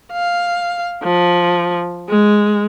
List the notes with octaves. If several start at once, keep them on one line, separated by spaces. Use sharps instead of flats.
F5
F3
G#3